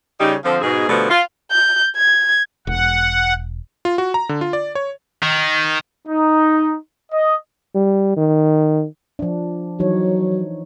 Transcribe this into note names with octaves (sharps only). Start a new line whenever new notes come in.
C#3 G3 D#4
D3 F3 C4
G#2 B2 G#4
B2 D3 F3 G3 A3 B3
F4
G6
G#6
E1 F#5
F4
F#4
A#5
D3
F4
D5
C#5
D#3
D#4
D#5
G3
D#3
F3 D4
E3 F#3 D#4 C#5